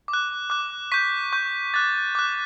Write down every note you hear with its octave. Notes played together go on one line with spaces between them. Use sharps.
D6
F#6
D6 F#6
C#6 G6 B6
C#6 G6
D6 F#6 A6
D6 F#6